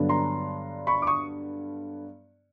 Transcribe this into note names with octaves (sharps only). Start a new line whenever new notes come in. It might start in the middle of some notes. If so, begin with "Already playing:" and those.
Already playing: G2 D3 F#3 B3 D4
A#5 C6
B5 C#6
D6
C#6 D#6